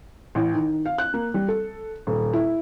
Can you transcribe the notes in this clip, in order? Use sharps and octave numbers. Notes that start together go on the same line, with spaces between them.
A1
D#3
F5
F#6
A#3
G3
A4
D#1
E4